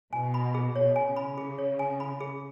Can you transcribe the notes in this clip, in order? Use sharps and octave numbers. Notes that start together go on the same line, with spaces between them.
B2 G#5
B5
G#4
B2 C#5
G#5
C#3
B5
G#4
C#5
G#5
B5
G#4